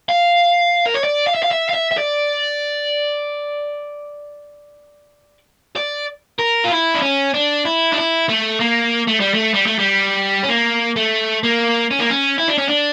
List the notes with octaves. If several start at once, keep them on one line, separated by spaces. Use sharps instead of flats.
F5
A#4
C#5
D5
F5
E5
F5
E5
F5
E5
E5
D5
D5
A#4
F4
E4
D4
C#4
D4
E4
D4
E4
A3
A#3
A3
G3
A3
G3
A3
G3
C#4
A#3
A3
A#3
C#4
A#3
C#4
E4
D4
C#4
D4